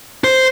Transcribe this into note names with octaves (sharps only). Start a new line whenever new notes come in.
C5